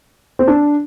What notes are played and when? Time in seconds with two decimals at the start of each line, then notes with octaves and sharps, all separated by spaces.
0.39 C4
0.48 D4